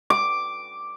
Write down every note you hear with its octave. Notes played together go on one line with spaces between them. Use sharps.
D6